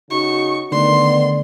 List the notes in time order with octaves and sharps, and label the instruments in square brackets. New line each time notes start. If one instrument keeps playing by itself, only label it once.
[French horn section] C#3 D#4 F#4 [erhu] C#6
[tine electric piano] D3 A3 [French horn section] D#3 B3 [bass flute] D5 [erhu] C6